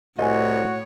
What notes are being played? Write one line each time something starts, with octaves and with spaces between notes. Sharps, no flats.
C2 A2 F#4 C#5 D#5 G#5